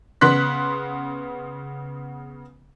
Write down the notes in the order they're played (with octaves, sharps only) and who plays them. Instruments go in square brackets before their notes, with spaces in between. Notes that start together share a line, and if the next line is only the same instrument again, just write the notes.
[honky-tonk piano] C#3 B3 C6 F#6 B6